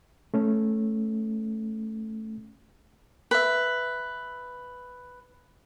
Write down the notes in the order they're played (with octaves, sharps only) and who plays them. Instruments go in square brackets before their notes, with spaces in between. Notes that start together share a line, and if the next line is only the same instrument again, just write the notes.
[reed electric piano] A3 C#4
[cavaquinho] B4 E5